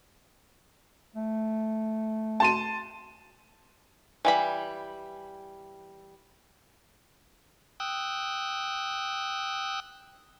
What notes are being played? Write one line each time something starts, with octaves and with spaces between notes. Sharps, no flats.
A3
A5 C6 D#7
E3 G3 B5
G5 D#6 E6 F#6